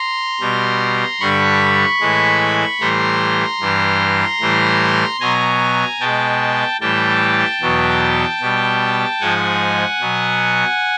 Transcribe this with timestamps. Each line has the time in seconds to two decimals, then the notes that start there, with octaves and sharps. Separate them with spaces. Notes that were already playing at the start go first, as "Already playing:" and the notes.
Already playing: A#5 C6
0.40 B2 G3
1.20 G2 D3 G3 B5 C#6
2.01 A2 E3 G#3
2.80 A2 E3 G3 A#5 C6
3.60 G2 E3 G3
4.40 A2 E3 G3
5.20 B2 F#3 G#5 A#5
6.00 B2 G#3 G5 A5
6.81 A2 E3 G3 G5 A5
7.61 E2 B2 F#3
8.41 B2 G3
9.20 G#2 F3 G#3 F#5 G#5
10.00 B2 F#3